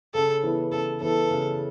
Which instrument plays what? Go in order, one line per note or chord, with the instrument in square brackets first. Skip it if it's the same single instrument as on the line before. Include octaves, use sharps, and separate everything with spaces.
[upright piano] C#3 [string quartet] A4
[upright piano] E3 B3
[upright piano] C#3 [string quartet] A4
[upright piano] E3 B3 [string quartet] A4
[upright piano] C#3